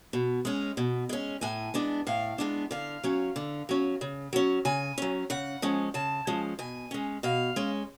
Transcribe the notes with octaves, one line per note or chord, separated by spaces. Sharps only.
B2
G#3 C#4
B2
G#3 C#4
A2 G#5
G#3 B3 D4
A2 F5
G#3 B3 D4
D3 F5
F#3 C#4
D3
F#3 C#4
C#3
F#3 C#4
C#3 G#5
F#3 C#4
C#3 F#5
F3 G#3 C#4
C#3 A5
F3 G#3 C#4
B2 G#5
G#3 C#4
B2 F5
G#3 C#4